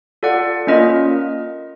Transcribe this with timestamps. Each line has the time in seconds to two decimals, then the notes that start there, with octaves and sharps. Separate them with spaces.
0.23 F4 A4 D5 F#5
0.67 A#3 C#4 F4 A#4 D#5